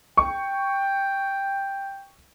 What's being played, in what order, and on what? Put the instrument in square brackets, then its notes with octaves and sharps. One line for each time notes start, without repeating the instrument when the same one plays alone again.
[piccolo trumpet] G5 [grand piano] C#6